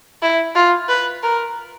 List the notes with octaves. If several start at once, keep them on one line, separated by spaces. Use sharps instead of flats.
E4
F4
B4
A#4